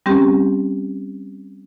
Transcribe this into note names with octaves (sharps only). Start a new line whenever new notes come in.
G3 C4 C#4 G4